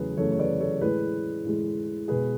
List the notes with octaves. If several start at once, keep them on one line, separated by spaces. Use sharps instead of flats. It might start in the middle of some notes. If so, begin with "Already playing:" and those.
Already playing: E2 C#3 F#3 A3 G#4 B4
E2 C#3 F#3 A3 A4 C#5
C#5
B4 D5
A4 C#5
A2 E3 G#3 G#4 B4
A2 E3 G#3
B2 G#3 G#4 B4